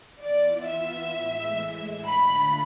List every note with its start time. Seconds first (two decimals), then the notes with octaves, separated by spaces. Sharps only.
0.21 E3 B3 F4 D5
0.68 E5
1.15 A2 E3 G#3
2.08 D3 A3 D4 F4 B5